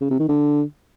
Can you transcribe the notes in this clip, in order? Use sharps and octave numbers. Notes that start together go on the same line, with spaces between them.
C#3
C3
D#3
D3